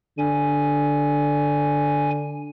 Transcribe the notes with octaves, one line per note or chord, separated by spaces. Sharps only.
D3 G#5